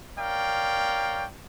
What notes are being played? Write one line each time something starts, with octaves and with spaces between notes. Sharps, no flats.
A#4 C#5 D5 F5 G5